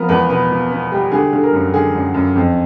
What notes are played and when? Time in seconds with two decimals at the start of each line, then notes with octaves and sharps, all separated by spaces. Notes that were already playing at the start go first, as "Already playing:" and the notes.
Already playing: F3 B3 A#4
0.09 E2 B4
0.29 B2 B4
0.51 B2
0.71 B3
0.92 G3
1.12 D3 G#4
1.33 D3
1.43 A#4
1.53 F#2
1.74 D3 G#4
1.94 F#2
2.14 F#2
2.36 F2